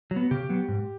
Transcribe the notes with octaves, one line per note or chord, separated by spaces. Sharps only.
F#3
B3
C#3 G4
F#3 B3
G#2